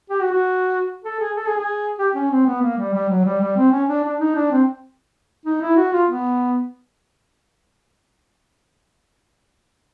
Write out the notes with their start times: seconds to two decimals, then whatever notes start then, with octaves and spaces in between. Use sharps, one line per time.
0.10 G4
0.20 F#4
0.32 F#4
1.04 A4
1.20 G#4
1.36 A4
1.46 G#4
1.57 G#4
1.98 G4
2.15 C#4
2.31 C4
2.46 B3
2.62 A#3
2.78 G3
2.93 G3
3.09 F#3
3.25 G3
3.41 G3
3.57 C4
3.72 C#4
3.89 D4
4.03 D4
4.20 D#4
4.35 D4
4.51 C4
5.46 D#4
5.61 E4
5.77 F#4
5.92 F4
6.09 B3